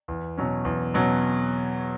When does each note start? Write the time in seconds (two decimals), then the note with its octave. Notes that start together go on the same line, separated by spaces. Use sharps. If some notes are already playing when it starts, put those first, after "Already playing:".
0.08 E2
0.37 B2 F#3 C#4
0.65 E2
0.94 B2 F#3 C#4